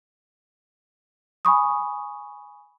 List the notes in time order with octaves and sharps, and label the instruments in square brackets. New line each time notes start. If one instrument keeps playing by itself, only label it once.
[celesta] G#5 B5 C#6 D#6